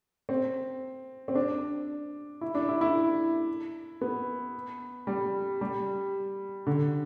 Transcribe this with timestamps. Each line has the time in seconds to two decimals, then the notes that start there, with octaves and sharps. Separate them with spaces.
0.29 C4
1.28 C4
1.35 D4
2.41 E4
2.55 D4
2.69 E4
2.81 E4
4.01 B3
5.07 G3
5.61 G3
6.67 D3